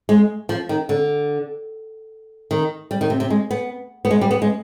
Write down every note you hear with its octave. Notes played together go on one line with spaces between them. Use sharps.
G#3
F3
D#3
D3
D#3
G3
D#3
C3
C3
G#3
B3
B3
G#3
G3
B3
G#3